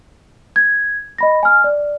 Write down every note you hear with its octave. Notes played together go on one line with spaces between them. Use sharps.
G#6
D#5 B5 A#6
G#5 F6
D5